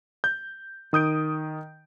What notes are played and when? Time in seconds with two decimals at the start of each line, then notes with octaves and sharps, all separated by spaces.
0.24 G6
0.93 D#3 D#6 G6 D7